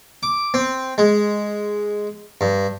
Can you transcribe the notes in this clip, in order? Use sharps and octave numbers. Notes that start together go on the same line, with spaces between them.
D6
C4
G#3
G2